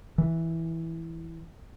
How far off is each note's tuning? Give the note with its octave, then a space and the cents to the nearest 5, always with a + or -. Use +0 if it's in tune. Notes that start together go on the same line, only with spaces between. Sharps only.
E3 -5